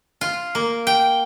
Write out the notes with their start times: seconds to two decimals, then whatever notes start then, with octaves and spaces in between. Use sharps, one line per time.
0.21 F4
0.55 A#3
0.87 G5